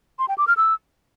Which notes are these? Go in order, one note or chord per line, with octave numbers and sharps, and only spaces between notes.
C6
G5
D6
F6
E6